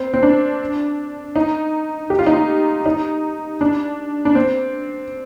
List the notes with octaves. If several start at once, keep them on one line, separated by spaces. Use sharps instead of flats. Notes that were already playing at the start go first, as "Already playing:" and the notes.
Already playing: C4
C4
D4
D#4
G4
F4
D#4
F4
D#4
D4
D4
C4